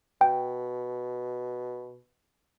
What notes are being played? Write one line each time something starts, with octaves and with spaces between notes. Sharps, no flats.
B2 G5